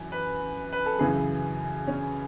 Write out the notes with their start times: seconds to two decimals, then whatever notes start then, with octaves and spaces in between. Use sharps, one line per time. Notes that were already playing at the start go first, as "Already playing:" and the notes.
Already playing: F#2 E3
0.12 B4
0.73 B4
0.86 A4
0.99 F#2 C#3 E3 G#4
1.88 C#4